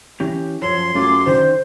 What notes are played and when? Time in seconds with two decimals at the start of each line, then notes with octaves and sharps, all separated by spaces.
0.20 E3 C#4 G4
0.62 F#2 F3 A4 C#5 C6
0.95 F#2 A3 F4 G#4 D6
1.26 D3 D#3 C5